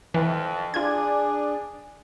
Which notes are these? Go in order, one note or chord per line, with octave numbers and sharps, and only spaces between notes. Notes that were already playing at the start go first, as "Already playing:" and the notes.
F2 E3
D4 F4 G#4 G#6